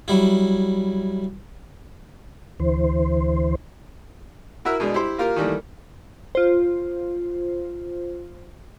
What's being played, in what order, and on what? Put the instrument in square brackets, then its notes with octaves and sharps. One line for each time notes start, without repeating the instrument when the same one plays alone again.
[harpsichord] F#3 G3 E4
[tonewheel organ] D2 E3 C5
[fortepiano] E4 F#4 A#4 E5
B2 G#3 D4
E4 G4 C5
A#3 F4 G4 A#4
D#3 E3 G3 A3 A#3
[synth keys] F4 C5